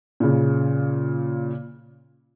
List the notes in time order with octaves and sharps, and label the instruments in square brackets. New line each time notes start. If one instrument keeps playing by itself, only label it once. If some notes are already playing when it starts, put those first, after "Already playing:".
[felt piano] A#2 C#3